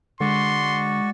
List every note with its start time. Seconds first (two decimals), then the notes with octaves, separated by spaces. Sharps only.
0.21 D3 G#3 F#4 D5 C6 C#6